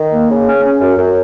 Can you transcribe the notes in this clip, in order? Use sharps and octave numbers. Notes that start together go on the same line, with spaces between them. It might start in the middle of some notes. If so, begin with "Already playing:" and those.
Already playing: D#3
A#3
C#3
C#4
C#4
F#2
F#2